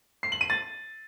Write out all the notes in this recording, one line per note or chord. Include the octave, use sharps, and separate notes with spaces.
C7
F#7
D#7
A6